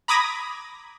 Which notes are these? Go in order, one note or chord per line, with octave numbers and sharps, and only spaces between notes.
A#5 B5 D6 D#6 G#6 A#6